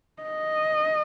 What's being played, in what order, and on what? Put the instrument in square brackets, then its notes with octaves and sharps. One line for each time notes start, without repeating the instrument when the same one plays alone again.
[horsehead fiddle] D#5